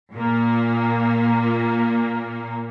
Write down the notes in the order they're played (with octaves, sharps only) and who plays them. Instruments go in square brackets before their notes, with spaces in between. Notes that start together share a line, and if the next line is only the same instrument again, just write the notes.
[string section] A#2 A#3